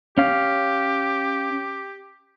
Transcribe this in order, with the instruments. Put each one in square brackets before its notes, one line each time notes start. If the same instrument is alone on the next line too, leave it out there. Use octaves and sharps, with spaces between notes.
[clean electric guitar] C#4 F5 [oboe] G4